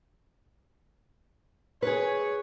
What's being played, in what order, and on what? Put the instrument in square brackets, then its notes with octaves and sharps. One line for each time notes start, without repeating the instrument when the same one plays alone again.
[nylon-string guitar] G#4 B4 [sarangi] C#5